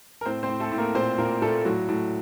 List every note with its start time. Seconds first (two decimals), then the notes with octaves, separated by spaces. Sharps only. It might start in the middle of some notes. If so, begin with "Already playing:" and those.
0.21 A#4
0.25 A2 C4 C5
0.43 C4 C5
0.49 A2
0.60 A3 A4
0.71 A2
0.78 A#3 A#4
0.95 A#2 C4 C5
1.18 A#2 A#3 A#4
1.42 A#2 A3 A4
1.65 A2 F#3 F#4
1.89 A2